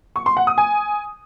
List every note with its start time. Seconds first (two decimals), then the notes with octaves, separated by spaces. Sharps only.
0.16 C#6
0.26 C6
0.37 F#5
0.47 D#6
0.58 G#5